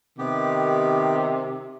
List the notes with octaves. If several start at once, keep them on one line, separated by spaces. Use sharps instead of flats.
C3 D#3 B3 G4